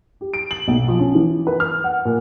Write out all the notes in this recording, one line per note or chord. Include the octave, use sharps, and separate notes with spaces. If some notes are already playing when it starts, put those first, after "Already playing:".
G4
D7
F#7
B1
F3
C#4
E3
B4
F6
F#5
A#2